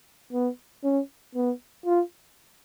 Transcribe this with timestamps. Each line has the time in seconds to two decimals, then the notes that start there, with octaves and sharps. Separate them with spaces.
0.33 B3
0.84 C#4
1.36 B3
1.85 F4